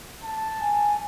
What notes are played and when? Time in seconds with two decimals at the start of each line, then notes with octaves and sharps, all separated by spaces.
0.24 A5
0.60 G#5